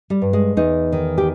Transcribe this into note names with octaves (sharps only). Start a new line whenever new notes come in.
G3
G2
G#3
E2 D#4
D#3
G4